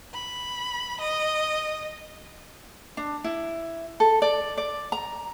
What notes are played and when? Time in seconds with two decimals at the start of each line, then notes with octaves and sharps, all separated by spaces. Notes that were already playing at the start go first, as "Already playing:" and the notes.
0.14 B5
1.01 D#5
2.97 D4
3.24 E4
4.00 A4
4.22 D5
4.57 D5
4.92 A#5